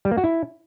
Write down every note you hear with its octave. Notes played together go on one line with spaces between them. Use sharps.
G3
A#3
F#4
E4